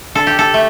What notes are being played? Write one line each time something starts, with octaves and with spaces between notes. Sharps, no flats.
D3 A4
G4
A4
A3